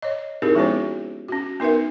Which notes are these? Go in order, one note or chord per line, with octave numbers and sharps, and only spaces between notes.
C#5 D#5
C4 D#4 E4 G4 G#4 A#4
F3 G#3 B3 C#4 F#4 C5
C#4 F#4
B3 D#4 A#4 B4 E5